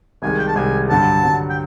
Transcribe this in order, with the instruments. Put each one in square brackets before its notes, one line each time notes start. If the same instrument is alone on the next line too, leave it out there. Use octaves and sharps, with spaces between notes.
[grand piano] C2 C3 D#3 G#3 [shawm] G#5
[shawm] G5
A5
[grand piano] C2 C3 D#3 G#3 [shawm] G#5
[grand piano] G2 D3 F#3 [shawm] A5
[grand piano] G2 D3 F#3
[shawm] G5